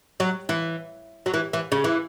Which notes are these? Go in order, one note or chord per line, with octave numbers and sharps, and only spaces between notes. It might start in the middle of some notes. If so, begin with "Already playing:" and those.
F#3
E3
F#3
E3
E3
C#3
E3